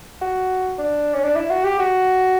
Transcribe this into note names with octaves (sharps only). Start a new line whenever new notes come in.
F#4
D4
C#4
D4
E4
F#4
G4
F#4